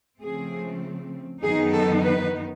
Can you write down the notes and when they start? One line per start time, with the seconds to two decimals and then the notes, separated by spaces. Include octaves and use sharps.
0.21 C#3 F3 A3 C4 G#4
1.42 F#2 D#3 F#3 B3 D#4 G#4
1.74 A4
2.04 B4